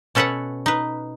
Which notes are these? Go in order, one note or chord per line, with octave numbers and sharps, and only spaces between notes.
B2 C#4 A4 B4 C#5 F#5
D#4 B4